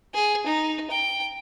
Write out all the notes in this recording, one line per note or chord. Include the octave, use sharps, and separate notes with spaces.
G#4
D#4
G5